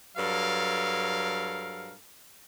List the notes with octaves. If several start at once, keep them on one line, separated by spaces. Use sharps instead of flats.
G2 F#3 A4 A#4 F5